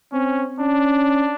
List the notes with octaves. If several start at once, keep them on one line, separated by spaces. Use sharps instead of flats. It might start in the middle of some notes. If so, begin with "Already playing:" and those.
C4 C#4
C#4 D4